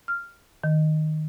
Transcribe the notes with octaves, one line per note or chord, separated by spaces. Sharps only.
F6
D#3